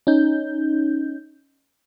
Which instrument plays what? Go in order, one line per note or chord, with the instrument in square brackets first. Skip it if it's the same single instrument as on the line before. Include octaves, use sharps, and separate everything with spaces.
[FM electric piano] C#4 D#4 G6